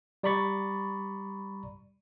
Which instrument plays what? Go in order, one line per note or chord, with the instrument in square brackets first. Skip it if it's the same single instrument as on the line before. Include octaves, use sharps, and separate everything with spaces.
[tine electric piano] G3 D5 A#5 B5 C#6 A6